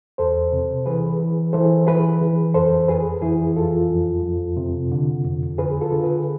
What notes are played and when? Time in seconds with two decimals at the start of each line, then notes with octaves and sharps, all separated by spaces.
0.18 E2 A4 C5
0.52 C3
0.86 E3 G#4 B4
1.20 E3
1.53 E3 A4 C5
1.87 E3 G#4 B4
2.21 E3
2.54 F2 A4 C5
2.88 F2 G#4 B4
3.22 E3 E4 G#4
3.56 F2 F4 A4
3.90 F2
4.23 F2
4.57 C3
4.92 D3
5.25 F2
5.58 D3 G#4 B4
5.81 F4 A4
5.92 D3
6.03 G#4 B4